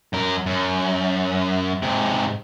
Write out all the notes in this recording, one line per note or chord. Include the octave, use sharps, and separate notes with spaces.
F#2 A#4
F#2
G#2 C3